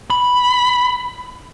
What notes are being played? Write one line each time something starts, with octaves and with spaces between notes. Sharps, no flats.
B5